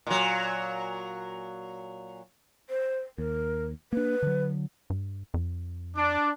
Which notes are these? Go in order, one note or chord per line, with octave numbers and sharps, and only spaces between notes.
A#2 F#3
C5
D#2 A#4
A#3 D4 B4
D3 F#3
G2
F2
D4 D6